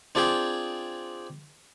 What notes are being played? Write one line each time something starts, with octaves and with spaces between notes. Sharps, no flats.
C4 D4 F4 G#4 G5